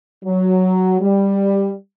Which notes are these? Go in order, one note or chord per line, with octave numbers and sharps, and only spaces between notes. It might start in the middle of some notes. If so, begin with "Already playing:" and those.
F#3
G3